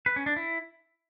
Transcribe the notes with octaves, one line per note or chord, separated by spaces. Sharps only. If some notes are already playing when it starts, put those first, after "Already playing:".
B4
C#4
D4
E4